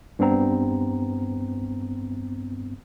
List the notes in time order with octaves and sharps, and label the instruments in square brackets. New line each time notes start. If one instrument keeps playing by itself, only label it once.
[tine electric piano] G2 B3 C4 A#5